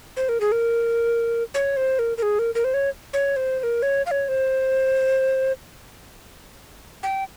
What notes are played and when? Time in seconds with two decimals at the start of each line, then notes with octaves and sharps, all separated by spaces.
0.17 C5
0.29 A#4
0.40 G#4
0.52 A#4
1.54 C#5
1.77 C5
1.99 A#4
2.18 A#4
2.23 G#4
2.39 A#4
2.55 A#4
2.64 C5
2.74 C#5
3.13 C#5
3.36 C5
3.60 C5
3.63 A#4
3.82 C#5
4.06 F5
4.11 C#5
4.28 C5
7.03 G5